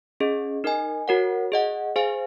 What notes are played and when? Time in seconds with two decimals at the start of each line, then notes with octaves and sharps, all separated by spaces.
0.20 C#4 G#4 D#5
0.64 D#4 A#4 D#5 G#5
1.08 F#4 A#4 C#5 F#5
1.52 G#4 D#5 F#5
1.96 G#4 C5 F5 G#5